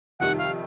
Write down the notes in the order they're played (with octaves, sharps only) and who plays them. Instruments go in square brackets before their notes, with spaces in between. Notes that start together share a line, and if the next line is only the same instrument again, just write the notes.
[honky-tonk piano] F2 C3 D#3 G3 [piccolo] F#5
[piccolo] F5